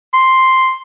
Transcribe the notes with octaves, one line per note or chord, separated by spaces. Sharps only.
C6